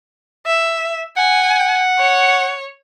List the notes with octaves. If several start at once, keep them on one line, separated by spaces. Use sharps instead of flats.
E5
F#5 G#5
C#5